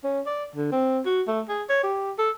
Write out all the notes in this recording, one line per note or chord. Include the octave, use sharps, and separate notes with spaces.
C#4
D5
D3
C4
F#4
A3
G#4
C#5
G4
A4